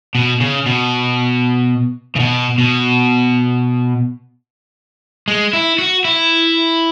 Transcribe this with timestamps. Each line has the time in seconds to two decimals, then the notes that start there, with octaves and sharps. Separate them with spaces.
0.15 B2
0.40 C#3
0.66 B2
2.16 C#3
2.20 B2
2.58 B2
5.28 G#3
5.53 E4
5.79 F#4
6.05 E4